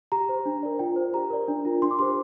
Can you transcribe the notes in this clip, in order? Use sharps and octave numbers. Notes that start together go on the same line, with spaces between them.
G4 A#5
C5
D4
A#4 D5
F4 G5
C5
G4 A#5
A#4 D5
D4
F4 A#4
D4 C6
D6
G4 C5 C6